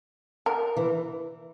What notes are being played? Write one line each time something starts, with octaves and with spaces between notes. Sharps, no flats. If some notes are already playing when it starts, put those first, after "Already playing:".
A#4
E3